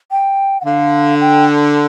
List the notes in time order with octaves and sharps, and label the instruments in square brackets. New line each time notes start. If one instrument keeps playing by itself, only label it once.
[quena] G5
F#5
[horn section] D3 [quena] F5
[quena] G5